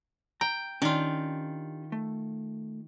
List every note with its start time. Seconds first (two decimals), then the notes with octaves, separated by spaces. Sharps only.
0.41 G5 A#5
0.82 D#3 C#4 D4 F4 G4
1.92 A3